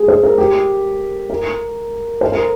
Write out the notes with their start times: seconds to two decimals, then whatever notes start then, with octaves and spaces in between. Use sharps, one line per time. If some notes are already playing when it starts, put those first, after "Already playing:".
Already playing: G#4
0.08 C5
0.23 A#4
0.38 G4
1.30 A#4
2.21 C5
2.32 A#4